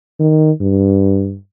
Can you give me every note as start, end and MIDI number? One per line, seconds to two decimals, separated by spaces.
0.20 0.52 51
0.61 1.37 43